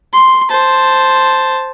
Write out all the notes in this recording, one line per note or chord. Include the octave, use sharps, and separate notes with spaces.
C6
C5 A5